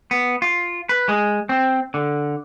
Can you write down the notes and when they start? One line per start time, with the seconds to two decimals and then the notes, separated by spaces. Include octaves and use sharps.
0.11 B3
0.42 F4
0.89 B4
1.09 G#3
1.49 C4
1.94 D3